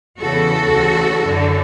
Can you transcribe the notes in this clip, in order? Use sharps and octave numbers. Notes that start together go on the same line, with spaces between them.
E2 C#3 E3 F#4 A4
D2 C#3 E3
F#2 D3